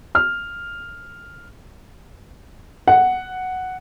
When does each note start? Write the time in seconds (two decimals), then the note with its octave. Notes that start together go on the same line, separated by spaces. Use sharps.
0.15 F6
2.88 F#5